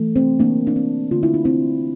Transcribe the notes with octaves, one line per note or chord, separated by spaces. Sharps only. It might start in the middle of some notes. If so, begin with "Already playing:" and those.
Already playing: E3 A3
C4
E3 A3 A#3 D4
D4
C4
D3 A3 F4
E4
D4
C4 E4